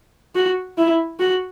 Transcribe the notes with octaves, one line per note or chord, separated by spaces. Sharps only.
F#4
E4
F#4